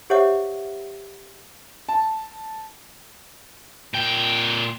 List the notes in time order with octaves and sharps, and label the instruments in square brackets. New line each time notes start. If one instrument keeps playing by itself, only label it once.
[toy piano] G4 C5 C#5 E5 F#5 D6
[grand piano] A5
[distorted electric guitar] A#2 G5